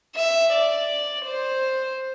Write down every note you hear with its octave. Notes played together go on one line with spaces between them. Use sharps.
E5
D5
C5